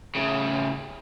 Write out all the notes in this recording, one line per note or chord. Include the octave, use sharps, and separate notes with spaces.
A2 C#3